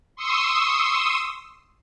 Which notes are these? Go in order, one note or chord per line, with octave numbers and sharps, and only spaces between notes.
C6 C#6 D#6 E6